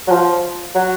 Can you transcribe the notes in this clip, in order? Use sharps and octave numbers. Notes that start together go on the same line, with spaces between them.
F#3
F3
F#3